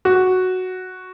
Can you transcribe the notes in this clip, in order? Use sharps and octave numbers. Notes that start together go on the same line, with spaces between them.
F#4